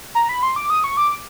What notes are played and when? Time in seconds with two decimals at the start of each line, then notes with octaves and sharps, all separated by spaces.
0.15 A#5
0.29 B5
0.43 C6
0.56 D6
0.70 D#6
0.84 C#6
0.97 D6